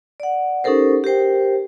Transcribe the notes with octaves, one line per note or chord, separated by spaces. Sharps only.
D5 F#5
C#4 D#4 G4 A4 A#4 C5
G4 A#4 C5 G5